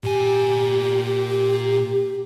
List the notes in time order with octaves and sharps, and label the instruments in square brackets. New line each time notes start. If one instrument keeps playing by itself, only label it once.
[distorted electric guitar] A#2 G#5 [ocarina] G4